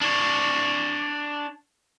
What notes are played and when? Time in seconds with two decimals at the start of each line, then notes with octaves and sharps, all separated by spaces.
0.01 D4 C#5